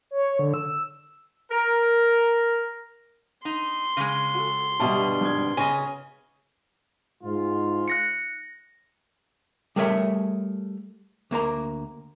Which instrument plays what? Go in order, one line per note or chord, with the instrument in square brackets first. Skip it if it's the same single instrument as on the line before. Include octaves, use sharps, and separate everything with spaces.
[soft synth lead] C#5
D3
E6
[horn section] A#4
[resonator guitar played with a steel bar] D#4 [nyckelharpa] C6
[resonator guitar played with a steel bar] C#3 G#3 [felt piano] F5
[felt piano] F#4 A4
[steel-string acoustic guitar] G2 B2 D3 [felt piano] G3 E5 A5
[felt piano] G#1 G#6
[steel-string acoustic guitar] C#3 [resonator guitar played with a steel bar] D#5 G#5
[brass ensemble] G#2 F4
[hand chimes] F#6 A#6 C#7
[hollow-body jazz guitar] G3 A3 G#4 A#4 C#5 E5
D2 A#3 A#4 A#5